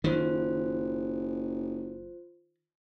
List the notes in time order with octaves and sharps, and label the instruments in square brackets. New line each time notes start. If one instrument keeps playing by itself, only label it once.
[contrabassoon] F#1 [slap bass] D#3 [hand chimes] F4 C5